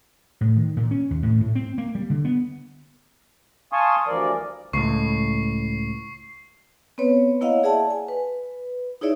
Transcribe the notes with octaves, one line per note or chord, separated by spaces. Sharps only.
A2
D#3
A#2
C#4
D#2
A2
A2
C4
A#3
G3
D3
B3
F5 G#5 A5 C6 C#6 D#6
D2 G2 E3 F3 A#4 D5
C#2 A2 C#6 C7
B3 C4 B4 C#5
A#3 E4 C#5 D#5 F5 F#5
G#4 D5 E5 F#5 A5
G#5
B4
D#4 E4 G#4 C#5 D5 E5